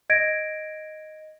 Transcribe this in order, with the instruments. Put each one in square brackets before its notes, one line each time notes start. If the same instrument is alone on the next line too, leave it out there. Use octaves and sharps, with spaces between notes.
[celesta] D#5 G#6 A#6 D7